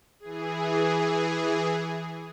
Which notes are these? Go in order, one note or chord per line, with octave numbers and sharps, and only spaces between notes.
E3 G#4